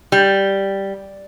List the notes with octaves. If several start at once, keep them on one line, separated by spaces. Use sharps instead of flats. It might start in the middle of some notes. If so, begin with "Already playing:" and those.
G3